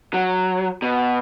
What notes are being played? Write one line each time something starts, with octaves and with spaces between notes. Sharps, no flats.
F#3
B2